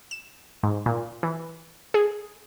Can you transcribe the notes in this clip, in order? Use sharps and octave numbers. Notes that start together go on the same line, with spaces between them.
E7
G#2
A#2
E3
G#4